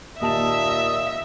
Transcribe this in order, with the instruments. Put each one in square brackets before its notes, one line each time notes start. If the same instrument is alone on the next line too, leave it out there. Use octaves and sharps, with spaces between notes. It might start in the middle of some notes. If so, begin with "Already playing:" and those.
[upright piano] D#2 A5 E7 [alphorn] A#2 [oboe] D#5 [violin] E5